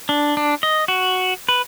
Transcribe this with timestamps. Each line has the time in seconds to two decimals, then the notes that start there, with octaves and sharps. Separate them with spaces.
0.09 D4
0.37 D4
0.63 D#5
0.88 F#4
1.49 B4